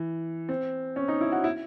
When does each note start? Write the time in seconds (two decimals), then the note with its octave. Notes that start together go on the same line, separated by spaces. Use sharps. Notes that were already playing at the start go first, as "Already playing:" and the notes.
Already playing: E3
0.49 C4
0.96 C#4
1.08 D#4
1.21 E4
1.32 F#4
1.44 E4